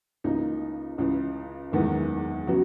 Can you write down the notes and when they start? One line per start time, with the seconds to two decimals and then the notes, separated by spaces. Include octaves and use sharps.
0.24 C#2 C#3 E3 A#3 D#4
0.98 C#2 C#3 E3
1.72 F#1 E2 D#3 G#3 B3
2.47 C#3 F#3 B3 F#4